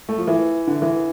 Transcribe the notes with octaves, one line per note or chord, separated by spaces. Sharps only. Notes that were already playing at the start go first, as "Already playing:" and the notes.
A3
F3
E3
D3
E3